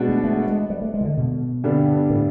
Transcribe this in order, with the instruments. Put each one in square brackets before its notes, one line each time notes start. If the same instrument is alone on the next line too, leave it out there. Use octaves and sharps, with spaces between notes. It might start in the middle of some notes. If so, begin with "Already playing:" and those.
Already playing: [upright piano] B2 G#3 B3 D4 F#4
[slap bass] A3
A3
A3
G#3
G3
A3
G#3
D#3
D3
B2
[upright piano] G2 D3 G3 B3 D4
[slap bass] A2